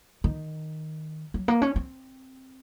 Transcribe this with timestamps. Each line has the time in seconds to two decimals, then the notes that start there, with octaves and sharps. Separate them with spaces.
0.24 D#3
1.34 F#3
1.48 A#3
1.62 C#4
1.76 C4